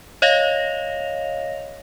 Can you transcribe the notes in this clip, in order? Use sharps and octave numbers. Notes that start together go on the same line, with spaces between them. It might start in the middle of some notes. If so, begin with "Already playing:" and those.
C#5 D#5 F5 A#6 F7